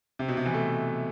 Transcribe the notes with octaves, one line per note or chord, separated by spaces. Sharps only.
C3
B2
C3
E3
A3